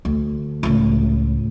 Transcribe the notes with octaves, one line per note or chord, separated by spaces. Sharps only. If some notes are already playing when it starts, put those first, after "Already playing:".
D2
C#2 A2